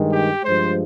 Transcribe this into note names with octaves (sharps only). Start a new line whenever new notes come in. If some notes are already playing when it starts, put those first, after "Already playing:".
Already playing: G2 D#3 G#3
G4
G2 F3 G#3 C5